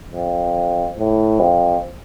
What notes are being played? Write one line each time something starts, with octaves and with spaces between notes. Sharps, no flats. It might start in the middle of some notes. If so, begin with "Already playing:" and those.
F2
A2
F2